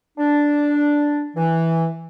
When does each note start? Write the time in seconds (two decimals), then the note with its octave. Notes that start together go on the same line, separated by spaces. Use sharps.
0.18 D4
1.36 E3